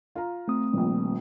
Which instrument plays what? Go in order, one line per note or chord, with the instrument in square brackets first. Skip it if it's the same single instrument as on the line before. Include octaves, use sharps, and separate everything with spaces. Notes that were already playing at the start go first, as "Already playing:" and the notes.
[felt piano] F4 A#5
[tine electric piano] A3 C4 D#6
[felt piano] D#1 A#1